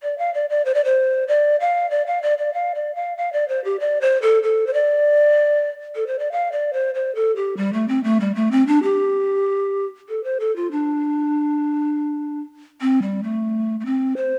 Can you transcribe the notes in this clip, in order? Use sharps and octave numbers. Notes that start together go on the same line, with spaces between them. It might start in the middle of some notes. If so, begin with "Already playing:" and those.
D5
F5
D5
D5
C5
D5
C5
D5
F5
D5
F5
D5
D5
F5
D5
F5
F5
D5
C5
G4
D5
C5
A4
A4
C5
D5
A4
C5
D5
F5
D5
C5
C5
A4
G4
G3
A3
C4
A3
G3
A3
C4
D4
G4
A4
C5
A4
F4
D4
C4
G3
A3
A3
C4
C5